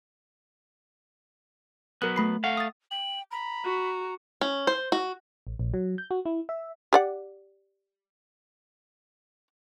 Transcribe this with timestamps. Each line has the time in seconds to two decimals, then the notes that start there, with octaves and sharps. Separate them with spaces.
2.02 F#3 B3 A#4 F#6
2.16 A3 B5 C7
2.44 A3 F5 F#5
2.57 D#6 A6
2.91 G5 F#7
3.31 A#5 B5
3.64 F#4
4.41 C#4
4.67 C5
4.92 F#4
5.47 A1
5.59 A#1
5.74 F#3
5.98 G6
6.11 F#4
6.26 E4
6.49 E5
6.93 G4 D5 F#5